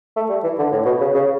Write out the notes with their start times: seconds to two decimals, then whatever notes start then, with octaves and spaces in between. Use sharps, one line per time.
0.16 A3
0.29 G3
0.43 E3
0.58 D3
0.71 A2
0.85 B2
1.00 C#3
1.14 C#3